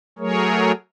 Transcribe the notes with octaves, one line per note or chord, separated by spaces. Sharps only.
F#3 A3 G#4 A#4 C#5